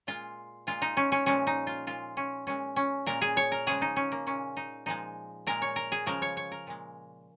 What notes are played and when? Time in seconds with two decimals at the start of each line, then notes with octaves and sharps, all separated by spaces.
0.07 A#2 G#3 F4
0.67 A#2 G#3 F4
0.82 D#4
0.97 C#4
1.12 C#4
1.26 A#2 F3 G#3 C#4
1.47 D#4
1.67 F4
1.87 A#2 G#3 F4
2.17 C#4
2.47 A#2 G#3 C#4
2.76 C#4
3.06 A#2 G#3 A#4
3.21 G#4
3.37 C#5
3.52 A#4
3.67 C#3 F3 G#3 G#4
3.82 D#4
3.96 C#4
4.12 A#3
4.27 A#2 G#3 C#4
4.57 D#4
4.86 A#2 F3 G#3 D#4
5.47 A#2 G#3 A#4
5.62 C#5
5.76 A#4
5.92 G#4
6.06 C#3 F3 G#3 A#4
6.22 C#5
6.37 C#5
6.52 A#4
6.67 A#2 G#3